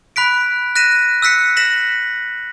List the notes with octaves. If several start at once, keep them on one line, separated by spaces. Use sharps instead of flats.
B5 F#6 B6 D7
F#6 A#6 B6 D#7 E7
E6 F#6 B6 C#7
A#6 B6 E7 F#7